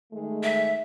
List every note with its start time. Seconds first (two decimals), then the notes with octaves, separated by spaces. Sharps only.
0.12 D#3 G#3 A3
0.43 E5